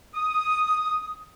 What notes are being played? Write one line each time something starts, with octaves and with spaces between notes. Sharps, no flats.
D#6